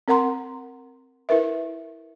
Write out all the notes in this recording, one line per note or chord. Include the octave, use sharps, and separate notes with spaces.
C4 A#4 F#5 A#5 C6
E4 A#4 B4 E5